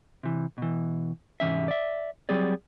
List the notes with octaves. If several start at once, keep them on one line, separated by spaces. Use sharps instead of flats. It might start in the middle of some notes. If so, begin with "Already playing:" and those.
C3 E3
B2 E3
C2 G#2 E3 C#4 E5
D5 E5
F#3 G3 C4 G#4 D5